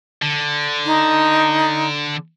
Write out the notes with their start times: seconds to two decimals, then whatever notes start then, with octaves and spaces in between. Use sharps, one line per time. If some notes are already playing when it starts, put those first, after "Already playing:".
0.22 D3
0.85 D#4